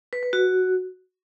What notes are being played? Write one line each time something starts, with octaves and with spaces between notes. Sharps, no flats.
B4
B4
F#4